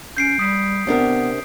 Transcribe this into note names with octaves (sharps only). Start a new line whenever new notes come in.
C#4 G6 C7 D7
G3 D#6 B6
C3 B3 D4 A#4